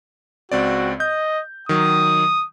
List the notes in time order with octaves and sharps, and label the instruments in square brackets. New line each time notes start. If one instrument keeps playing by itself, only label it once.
[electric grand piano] C#2 C4 D5 [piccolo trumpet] F#4
[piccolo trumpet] D#5 [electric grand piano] G6
[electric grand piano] D#3 F#3 [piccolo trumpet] D#6